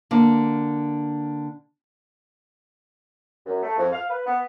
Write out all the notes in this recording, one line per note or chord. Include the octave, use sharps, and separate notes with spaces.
D3 A#3
F#2
A3
F2
F5
B4
B3